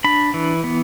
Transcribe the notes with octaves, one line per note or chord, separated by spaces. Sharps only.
D4 B5
E3
B3